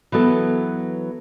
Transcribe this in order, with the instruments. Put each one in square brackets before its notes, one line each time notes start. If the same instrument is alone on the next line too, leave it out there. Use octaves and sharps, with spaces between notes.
[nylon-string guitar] E3 F#3 B3 A4